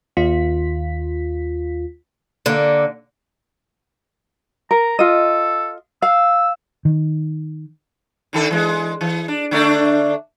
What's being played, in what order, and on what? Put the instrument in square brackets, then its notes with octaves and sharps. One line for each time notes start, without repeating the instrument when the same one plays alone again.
[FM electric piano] D#2 F4 B6
[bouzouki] D3 A#3
[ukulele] A#4 [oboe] A#5
[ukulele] F4 D#5 [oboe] A4
[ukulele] F5 [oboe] E6
[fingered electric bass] D#3
[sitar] D3 D#3 A4
E3 G#3
E3
D4
D3 A3 D4